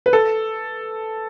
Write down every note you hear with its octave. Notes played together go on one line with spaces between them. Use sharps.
B4
A4